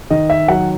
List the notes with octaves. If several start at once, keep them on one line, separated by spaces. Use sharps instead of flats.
D#3 D#5
E5
F#3 F#5